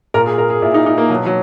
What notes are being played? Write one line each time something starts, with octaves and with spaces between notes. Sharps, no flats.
A#2 A#4
G#4
A#4
G#4
A#2 E4
D#4
D#4
A#3
B2 F#3
F#3